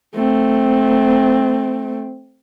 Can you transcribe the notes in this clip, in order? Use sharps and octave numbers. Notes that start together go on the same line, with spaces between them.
A3 C4